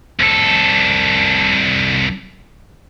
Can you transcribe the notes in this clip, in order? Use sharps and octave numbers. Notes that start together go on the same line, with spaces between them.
C2 A4